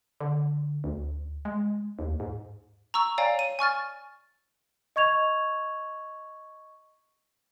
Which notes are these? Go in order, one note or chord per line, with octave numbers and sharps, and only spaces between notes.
D3
D2
G#3
D#2
G#2
A#5 C#6 E6
C#5 D5 F5 G5 G#5 A#5
D#7
G#5 C#6 F6 A6
D#5 C#6 G#6 F7